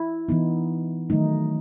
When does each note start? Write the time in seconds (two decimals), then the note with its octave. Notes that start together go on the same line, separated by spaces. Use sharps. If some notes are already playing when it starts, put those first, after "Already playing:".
Already playing: E4
0.29 E3 B3 D#4
1.10 D#3 F#3 A3 D#4